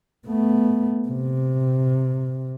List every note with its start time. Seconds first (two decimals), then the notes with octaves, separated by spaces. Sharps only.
0.28 A3 B3
1.08 C3